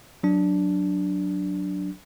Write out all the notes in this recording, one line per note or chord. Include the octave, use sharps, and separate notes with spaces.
F#3 D4